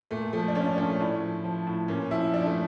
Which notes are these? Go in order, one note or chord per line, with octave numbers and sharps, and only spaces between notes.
A#2 A3
F3 A3
D4
F3 C#4
D4
A#2 C#4
A3
A2
F3
F3
A2
A#2 C#4
F3 E4
F3 D4
A3